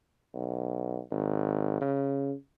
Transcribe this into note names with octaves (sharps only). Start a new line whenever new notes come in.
B1
G#1
C#3